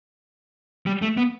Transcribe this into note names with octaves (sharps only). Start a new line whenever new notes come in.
G3
A3
B3